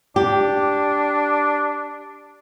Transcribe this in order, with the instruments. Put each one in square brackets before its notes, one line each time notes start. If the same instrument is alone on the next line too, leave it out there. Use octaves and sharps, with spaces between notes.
[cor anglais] D4 [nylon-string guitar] G4